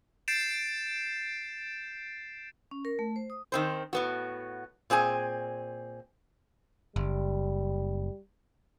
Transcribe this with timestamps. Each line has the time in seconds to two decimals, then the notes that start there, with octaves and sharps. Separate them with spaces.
0.28 G6 A6 C7 D7 E7
2.71 C#4
2.85 A#4
2.99 A3
3.16 C5
3.30 D#6
3.52 D#3 C4 C5
3.93 A2 B3 F#4
4.90 A#2 C4 G#4 G#5
6.96 F#1 G3